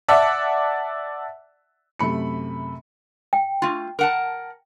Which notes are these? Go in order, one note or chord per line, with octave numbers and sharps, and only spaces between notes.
D5 E5 F#5 A5
F#2 C3 A3 B5 C#7
G5
A3 F4
A#4 F#5 A5